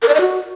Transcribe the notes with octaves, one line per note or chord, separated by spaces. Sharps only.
A#4
D5
D#5
F#4